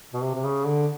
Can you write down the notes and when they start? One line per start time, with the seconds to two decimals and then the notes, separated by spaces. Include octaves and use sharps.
0.13 B2
0.22 C3
0.35 C3
0.45 C#3
0.66 D3